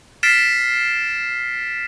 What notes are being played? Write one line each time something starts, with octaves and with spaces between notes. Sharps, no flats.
F6 A6 B6 C7 D7 E7